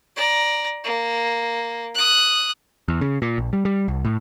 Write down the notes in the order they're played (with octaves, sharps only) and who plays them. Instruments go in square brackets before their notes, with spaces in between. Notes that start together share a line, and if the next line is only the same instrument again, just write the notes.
[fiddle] D5 A#5
A#3
D#6 F#6
[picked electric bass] E2
C#3
A#2
A#1
G3
G3
C2
A2